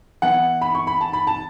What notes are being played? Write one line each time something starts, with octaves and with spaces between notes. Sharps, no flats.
E3 B3 E4 F#5
B5
C#6
B5
A5
B5
A5